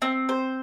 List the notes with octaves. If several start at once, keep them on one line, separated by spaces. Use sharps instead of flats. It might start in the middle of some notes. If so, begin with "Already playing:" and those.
C4
C5